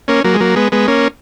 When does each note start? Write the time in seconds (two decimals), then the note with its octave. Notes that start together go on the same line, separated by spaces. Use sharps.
0.08 A#3 C#4
0.24 F#3 A#3
0.34 G#3
0.41 F#3 A#3
0.56 G#3 B3
0.72 G#3 B3
0.88 A#3 C#4